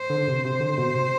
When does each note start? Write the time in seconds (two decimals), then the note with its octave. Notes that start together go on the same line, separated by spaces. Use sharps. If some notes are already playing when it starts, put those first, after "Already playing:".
Already playing: C5
0.10 D3
0.28 C3
0.44 C3 C5
0.60 D3
0.78 B2
0.94 C3